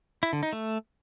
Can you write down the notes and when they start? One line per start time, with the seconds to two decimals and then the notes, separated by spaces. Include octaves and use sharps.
0.23 E4
0.33 D3
0.43 D#4
0.53 A3